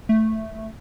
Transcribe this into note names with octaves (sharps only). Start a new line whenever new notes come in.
A3